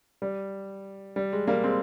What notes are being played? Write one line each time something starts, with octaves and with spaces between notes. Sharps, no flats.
G3
G3
G#3
G3 A#3
G#3 C4